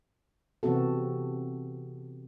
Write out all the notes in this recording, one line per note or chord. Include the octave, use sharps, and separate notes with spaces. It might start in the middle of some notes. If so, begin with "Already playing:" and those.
C3 E3 B3 C4 F#4 A4